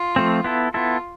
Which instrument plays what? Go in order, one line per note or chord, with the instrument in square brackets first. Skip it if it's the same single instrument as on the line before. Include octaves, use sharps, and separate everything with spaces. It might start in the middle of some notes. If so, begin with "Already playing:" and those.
Already playing: [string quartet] F4
[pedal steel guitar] F3 A3 C4
B3 E4 A4
[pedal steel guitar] B3 E4 A4 [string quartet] F4